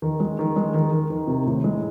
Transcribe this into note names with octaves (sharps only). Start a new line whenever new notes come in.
D#3
G#3
D#3
G#3
D#3
D#3
D#3
C3
A2
G#3